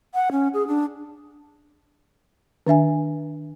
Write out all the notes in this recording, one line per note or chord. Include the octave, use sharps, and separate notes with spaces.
F#5
C#4
G#4
D4
D#3 D4 E5 G#5